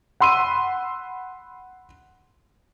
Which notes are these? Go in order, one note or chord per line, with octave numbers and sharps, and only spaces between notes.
F#5 B5 C6 E6 D#7